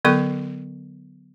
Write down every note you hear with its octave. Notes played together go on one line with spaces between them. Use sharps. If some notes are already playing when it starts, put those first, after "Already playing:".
D3 F#3 B3 A4 C#6